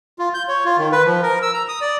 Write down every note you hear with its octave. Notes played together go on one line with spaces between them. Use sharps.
F4
G6
C#5
F4
D#3
B4
F3
A#4
E6
A#5
D#6
D5